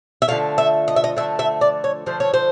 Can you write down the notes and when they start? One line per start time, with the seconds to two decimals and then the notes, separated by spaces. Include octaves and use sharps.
0.22 E5
0.28 D3 F3 A3 F5
0.58 E5
0.88 D#5
0.96 E5
1.04 D#5
1.17 D3 F3 A3 E5
1.39 E5
1.61 D5
1.84 C#5
2.06 D3 F3 A3 C5
2.20 C#5
2.34 C5